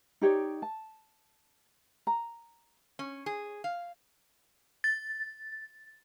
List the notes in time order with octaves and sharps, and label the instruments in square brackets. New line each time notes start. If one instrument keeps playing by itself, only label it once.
[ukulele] D#4 G4 C#5 D5
A5
A#5
[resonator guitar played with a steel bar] C#4
G#4
F5
[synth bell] A6